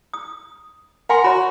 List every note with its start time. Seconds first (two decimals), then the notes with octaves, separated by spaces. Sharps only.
0.14 D#6
1.10 A#4 F#5 G#5 C6
1.24 F#4 C#5 B5